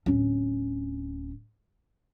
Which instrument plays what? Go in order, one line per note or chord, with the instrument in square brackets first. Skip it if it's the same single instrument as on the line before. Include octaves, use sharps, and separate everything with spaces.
[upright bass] D1 C#4